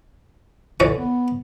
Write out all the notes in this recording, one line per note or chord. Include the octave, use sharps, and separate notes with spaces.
D3 E3 C#5 D5
B3